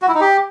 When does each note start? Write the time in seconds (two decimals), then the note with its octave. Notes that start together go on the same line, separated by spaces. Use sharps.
0.02 F#4
0.08 E4
0.14 D#4
0.21 G4